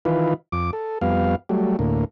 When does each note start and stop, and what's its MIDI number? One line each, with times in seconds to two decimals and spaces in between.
0.05 0.34 51
0.05 0.34 52
0.05 0.34 65
0.05 0.34 71
0.52 0.71 41
0.52 0.71 86
0.73 0.98 69
1.01 1.35 41
1.01 1.35 55
1.01 1.35 59
1.01 1.35 77
1.49 1.77 54
1.49 1.77 55
1.49 1.77 57
1.79 2.04 38
1.79 2.04 45
1.79 2.04 58